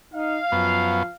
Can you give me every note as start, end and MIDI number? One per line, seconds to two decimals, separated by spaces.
0.14 0.38 63
0.14 1.16 77
0.52 1.03 42
0.52 1.09 53
0.52 1.03 59